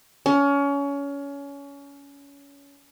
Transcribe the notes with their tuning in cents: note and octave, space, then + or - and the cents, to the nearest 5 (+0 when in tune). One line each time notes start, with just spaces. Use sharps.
C#4 +25